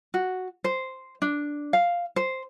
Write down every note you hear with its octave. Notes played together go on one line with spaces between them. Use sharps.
F#4
C5
D4
F5
C5